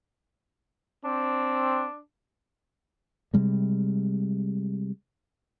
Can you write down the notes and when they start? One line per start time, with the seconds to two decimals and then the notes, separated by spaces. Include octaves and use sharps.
1.05 C4 D4
3.34 C3 G3 G#3